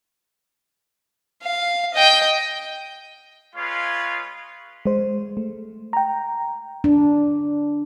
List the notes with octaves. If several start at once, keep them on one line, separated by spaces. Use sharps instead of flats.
F5
D#5 G5
G#3 F4 B4 C#5 F5
G#3 C5
A3
G5 A#5
D4